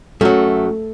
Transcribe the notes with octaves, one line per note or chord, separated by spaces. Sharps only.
F#2 F#3 A3